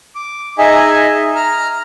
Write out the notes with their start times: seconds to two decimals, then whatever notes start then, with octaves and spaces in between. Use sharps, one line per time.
0.15 D6
0.58 D#4 G#4 D#5 E5 G#5
1.36 A#5 F6